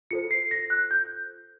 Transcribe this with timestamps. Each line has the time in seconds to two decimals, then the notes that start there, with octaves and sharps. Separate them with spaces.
0.11 F4 A4 C5 C#7
0.31 C7
0.51 A#6
0.70 F#6
0.91 G6